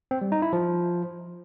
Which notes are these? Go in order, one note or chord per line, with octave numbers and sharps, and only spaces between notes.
C4
G3
D#4
E4
F3